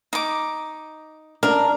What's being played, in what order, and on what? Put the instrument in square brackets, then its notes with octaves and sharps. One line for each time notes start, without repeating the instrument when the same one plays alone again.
[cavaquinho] D#4 D6
[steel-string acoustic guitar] D4 [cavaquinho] A#4